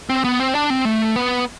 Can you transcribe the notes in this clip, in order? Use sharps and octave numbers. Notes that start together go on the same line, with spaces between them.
C4
B3
C4
D4
C4
A3
B3